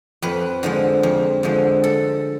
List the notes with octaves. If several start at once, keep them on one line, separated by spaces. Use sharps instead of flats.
F2 B4
D3 F3 G#3
F2
D3 F3 G#3
A4